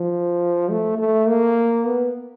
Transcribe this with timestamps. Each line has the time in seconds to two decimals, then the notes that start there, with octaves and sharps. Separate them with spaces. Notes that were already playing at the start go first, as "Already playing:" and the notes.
Already playing: F3
0.69 A3
0.98 A3
1.28 A#3
1.86 B3